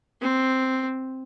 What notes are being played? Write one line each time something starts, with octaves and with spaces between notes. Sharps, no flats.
C4